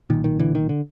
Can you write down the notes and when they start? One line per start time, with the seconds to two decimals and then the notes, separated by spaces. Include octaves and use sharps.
0.10 B1 A#2 D#3
0.24 D#3
0.39 D3 E3
0.55 D#3
0.69 D3